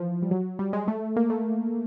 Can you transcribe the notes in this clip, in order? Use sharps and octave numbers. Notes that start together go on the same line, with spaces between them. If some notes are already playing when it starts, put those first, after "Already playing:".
Already playing: E3 F3
G3
F#3
G3
G#3
A3
A#3
A3